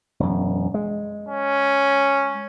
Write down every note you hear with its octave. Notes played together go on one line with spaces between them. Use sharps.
E1 F#2
G#3
C#4